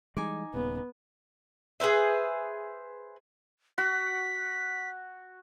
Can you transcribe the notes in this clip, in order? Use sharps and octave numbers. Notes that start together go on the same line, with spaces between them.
E3 G3 G#3 D#4 G#5 D6
D#1 D#2 C#3 B3
G#4 B4 C5 E5
F#4 B6